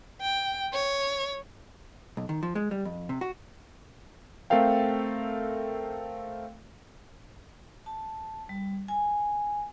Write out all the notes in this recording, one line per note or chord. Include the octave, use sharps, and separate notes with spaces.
G5
C#5
B1
D#3
F3
G#3
G3
F2
C3
F#4
A3 C4 A4 A#4 F5 G5
A5
G3
G#5